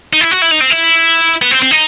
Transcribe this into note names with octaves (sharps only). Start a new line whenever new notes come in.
D#4
E4
F#4
E4
D#4
C4
E4
B3
C4
C4
D#4